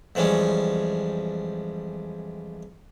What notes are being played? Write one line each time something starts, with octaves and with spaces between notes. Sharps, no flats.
F2 E3 F3 G3 G#3 C#4